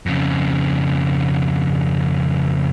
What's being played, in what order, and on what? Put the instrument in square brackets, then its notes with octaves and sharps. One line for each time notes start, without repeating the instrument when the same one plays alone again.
[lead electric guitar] F2 C#3